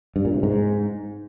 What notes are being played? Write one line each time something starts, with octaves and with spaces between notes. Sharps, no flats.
G2
A#2
C3
G#2